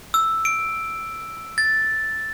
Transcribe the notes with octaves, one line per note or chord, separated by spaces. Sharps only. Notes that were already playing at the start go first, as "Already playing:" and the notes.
E6
D7
A6